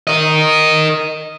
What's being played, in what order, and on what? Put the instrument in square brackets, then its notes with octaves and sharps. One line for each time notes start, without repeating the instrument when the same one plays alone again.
[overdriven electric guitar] A#4 D#5